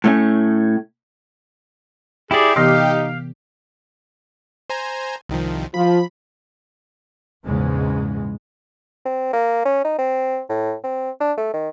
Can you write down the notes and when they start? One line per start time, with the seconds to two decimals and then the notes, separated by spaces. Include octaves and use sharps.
0.04 A2 A3 C#4
2.31 E4 G4 G#4 D5
2.56 C3 E3 B3 D#4 F5
4.70 C5 G#5 A#5
5.29 C2 D#3 F3
5.74 F3 B5
7.45 A#1 E2 G#2 C#3 G#3
9.06 C4
9.33 A#3
9.66 C#4
9.85 D#4
9.99 C4
10.49 A2
10.84 C4
11.20 D4
11.37 A3
11.54 D#3